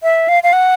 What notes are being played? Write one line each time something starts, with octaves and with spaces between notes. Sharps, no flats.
E5
F5
F5
F#5